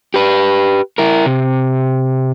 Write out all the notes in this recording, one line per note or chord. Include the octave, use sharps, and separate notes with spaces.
G4 B4
E4 A#4
C3